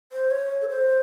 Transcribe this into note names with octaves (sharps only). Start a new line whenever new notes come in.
C5
C#5
A4
C5